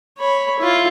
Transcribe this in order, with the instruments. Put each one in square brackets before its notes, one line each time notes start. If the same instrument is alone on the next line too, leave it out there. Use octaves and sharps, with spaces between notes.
[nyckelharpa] C#5 B5
E4 F4